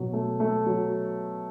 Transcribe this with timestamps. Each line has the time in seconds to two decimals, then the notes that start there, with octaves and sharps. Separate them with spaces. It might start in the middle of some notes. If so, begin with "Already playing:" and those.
Already playing: B2 F#3
0.13 A3
0.40 A3
0.66 F#3